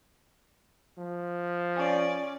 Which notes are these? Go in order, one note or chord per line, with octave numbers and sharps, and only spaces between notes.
F3
C#4 D5